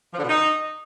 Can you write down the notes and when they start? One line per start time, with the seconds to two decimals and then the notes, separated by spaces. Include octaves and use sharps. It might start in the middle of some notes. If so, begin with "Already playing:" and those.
0.14 F3
0.19 D3
0.24 B2
0.29 D#4